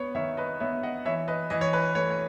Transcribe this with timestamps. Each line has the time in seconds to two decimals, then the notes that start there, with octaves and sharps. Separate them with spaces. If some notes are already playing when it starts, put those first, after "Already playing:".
Already playing: B3 B4 C#5
0.15 D#3 C#5 E5
0.37 B4 D#5
0.60 B3 C#5 E5
0.83 D#5 F#5
1.05 E3 C#5 E5
1.28 B4 D#5
1.50 E3 D#5
1.61 C#5
1.73 B4
1.95 A3 C#5
2.10 C#5